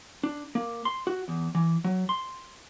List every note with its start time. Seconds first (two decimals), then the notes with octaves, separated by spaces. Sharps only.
0.23 D4
0.55 A#3
0.85 C6
1.07 F#4
1.28 E2
1.55 E3
1.84 F#3
2.09 C6